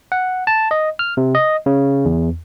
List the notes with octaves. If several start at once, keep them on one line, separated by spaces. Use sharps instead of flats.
F#5
A5
D#5
F6
C3
D#5
C#3
E2